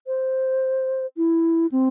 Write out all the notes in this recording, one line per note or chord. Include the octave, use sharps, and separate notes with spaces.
C5
E4
C4